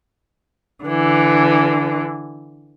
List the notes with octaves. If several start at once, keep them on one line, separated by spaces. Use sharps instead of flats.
D3 E3